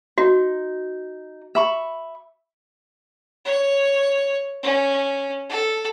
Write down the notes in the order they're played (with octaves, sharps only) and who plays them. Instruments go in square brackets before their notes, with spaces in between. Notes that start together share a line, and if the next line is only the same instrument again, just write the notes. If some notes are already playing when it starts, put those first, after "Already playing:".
[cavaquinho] D#4 [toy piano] F#4
[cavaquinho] E5 B5 C#6
[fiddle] C#5
C#4
A4